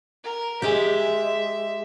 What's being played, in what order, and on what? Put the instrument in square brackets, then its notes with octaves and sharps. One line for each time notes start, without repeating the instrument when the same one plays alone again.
[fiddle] A#4
[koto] G#3 G4 [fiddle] E5